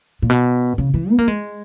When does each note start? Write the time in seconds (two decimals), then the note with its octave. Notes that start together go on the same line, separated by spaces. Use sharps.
0.22 A#2
0.30 B2
0.78 C#3
0.94 E3
1.10 B3
1.19 A#3
1.28 G#3